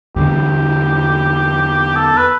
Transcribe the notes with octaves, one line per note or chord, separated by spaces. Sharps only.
E2 D3 G3 G4
A4
B4